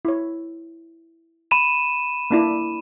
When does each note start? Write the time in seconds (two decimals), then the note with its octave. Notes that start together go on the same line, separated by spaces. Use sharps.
0.05 E4 C#5
1.51 B5 D#7 E7
2.31 A#3 D4 E4